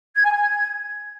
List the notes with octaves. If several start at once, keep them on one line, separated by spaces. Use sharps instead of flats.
G#6
G#5
G#6